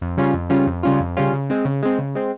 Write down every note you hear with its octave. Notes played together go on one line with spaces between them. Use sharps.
F2
C#3 G3 C#4 F4
F2
C#3 G3 C#4 F4
F2
C#3 G3 C#4 F4
F2
C#3 G3 C#4 F4
C#3
G#3 C4
C#3
G#3 C4
C#3
G#3 C4